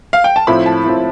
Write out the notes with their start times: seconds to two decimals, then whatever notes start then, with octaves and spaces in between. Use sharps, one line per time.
0.13 F5
0.24 G5
0.36 A5
0.47 A2 F3 C4 E4 B5
0.66 A5
0.84 A2 F3 C4 E4